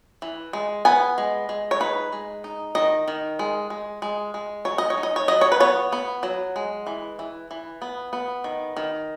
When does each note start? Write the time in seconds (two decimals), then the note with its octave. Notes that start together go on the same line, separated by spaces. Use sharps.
0.22 E3
0.53 G#3
0.85 B3 G#5
1.18 G#3
1.49 G#3
1.71 C#5
1.80 D#4 B4
2.13 G#3
2.44 D#4
2.75 D#3 D#5
3.08 D#3
3.39 G#3
3.70 G#3
4.02 G#3
4.34 G#3
4.65 F#3 C#5
4.78 D#5
4.90 C#5
4.98 D#4
5.03 D#5
5.16 C#5
5.28 F#3 D#5
5.41 C#5
5.52 B4
5.60 B3 C#5
5.92 B3
6.23 F#3
6.56 G#3
6.87 E3
7.19 E3
7.51 E3
7.82 B3
8.13 B3
8.44 D#3
8.77 D#3